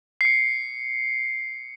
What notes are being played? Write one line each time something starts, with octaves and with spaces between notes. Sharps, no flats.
C7 C#7